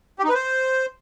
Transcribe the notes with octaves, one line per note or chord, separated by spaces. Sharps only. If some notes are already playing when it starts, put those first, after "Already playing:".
G4
D#4
B4
C5